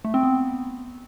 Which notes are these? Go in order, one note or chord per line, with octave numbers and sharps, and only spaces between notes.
A3
C4
B3